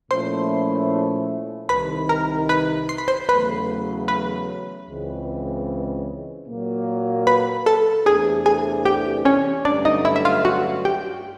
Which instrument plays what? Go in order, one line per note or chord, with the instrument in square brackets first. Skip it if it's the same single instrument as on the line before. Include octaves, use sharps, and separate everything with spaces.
[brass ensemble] A#2 F3 A3 C#4 E4 [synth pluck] C5 C6
[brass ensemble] C2 C3 D#3 [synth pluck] B4 B5
[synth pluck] A#4 A#5
B4 B5
C6
B5
C5 C6
[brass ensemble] E2 C#3 F#3 A3 [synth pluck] B4 B5
[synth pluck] B4 B5
[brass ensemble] C#2 C#3 E3 G#3 C4
A#2 F#3 A#3
[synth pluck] B4 B5
A4 A5
[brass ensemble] E2 C3 E3 A3 D4 [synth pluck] G#4 G#5
[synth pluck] G#4 G#5
G4 G5
C#4 C#5
[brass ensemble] G2 D3 F#3 A3 C#4 [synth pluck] D4 D5
[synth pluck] D#4 D#5
E4 E5
E5
F4 F5
F#4 F#5
G4 G5